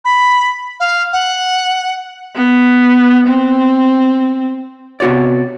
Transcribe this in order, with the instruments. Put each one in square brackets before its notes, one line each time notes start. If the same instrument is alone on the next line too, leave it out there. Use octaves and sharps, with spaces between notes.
[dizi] B5
F5
F#5
[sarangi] B3
C4
[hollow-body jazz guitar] C3 B3 F#4 C#5 D5